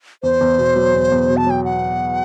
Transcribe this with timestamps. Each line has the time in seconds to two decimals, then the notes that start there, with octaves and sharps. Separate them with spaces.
0.23 E2 C5
0.40 E2
0.58 B2
0.76 F#3
0.94 E2
1.11 E2
1.29 B2
1.37 A5
1.46 F#3 G5
1.64 F#5